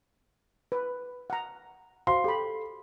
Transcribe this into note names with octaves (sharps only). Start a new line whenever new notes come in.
B4
F#5 A#5
F#4 C5 F5 C6
G4 A4 G5 B5